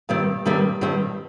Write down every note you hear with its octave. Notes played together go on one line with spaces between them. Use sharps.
G2 D#3 G3 C4
G2 D#3 G3 C4
G2 D#3 G3 C4